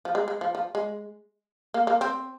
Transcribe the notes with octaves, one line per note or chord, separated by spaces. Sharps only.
F3
G#3
G#3
F3
F3
G#3
A#3
A#3
C4